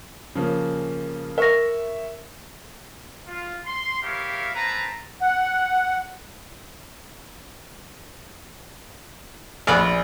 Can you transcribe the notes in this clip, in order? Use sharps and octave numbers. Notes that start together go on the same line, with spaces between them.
C#3 F3 A#3
A#4 E5 C#6 A#6
F4
C6
E4 G4 A#4 C#5 E5 F5
A#3 C4 B4 A5 A#5
F#5
A#1 B3 D5 F5